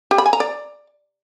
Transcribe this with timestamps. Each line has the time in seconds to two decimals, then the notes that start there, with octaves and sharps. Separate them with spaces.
0.11 G4
0.18 B5
0.26 G#5
0.33 A#5
0.40 D5